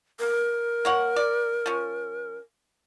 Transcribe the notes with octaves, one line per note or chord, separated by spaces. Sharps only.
A#4
A#3 C#5 F#5
D5
F3 C#4